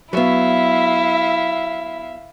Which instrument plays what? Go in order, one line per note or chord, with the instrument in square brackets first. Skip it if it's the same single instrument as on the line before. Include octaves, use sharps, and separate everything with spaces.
[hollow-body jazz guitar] F#3 B3 [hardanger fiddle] E4 [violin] E5 F5